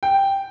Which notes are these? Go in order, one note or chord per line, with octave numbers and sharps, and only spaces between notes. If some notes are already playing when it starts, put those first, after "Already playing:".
G5